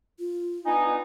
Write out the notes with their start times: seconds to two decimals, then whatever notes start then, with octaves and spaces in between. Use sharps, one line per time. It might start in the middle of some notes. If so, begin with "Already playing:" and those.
0.19 F4
0.66 B3 D4 D#4 G#5